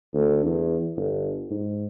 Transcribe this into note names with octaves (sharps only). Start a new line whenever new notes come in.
D2
E2
G1
G#2